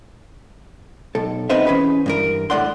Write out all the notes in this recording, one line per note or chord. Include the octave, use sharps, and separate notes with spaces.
B1 A4
B3 C4 D#4 B4 C5 E5
E3 C#4 G#4 B4
G2 E3 A#4
A2 D3 D5 F#5 C6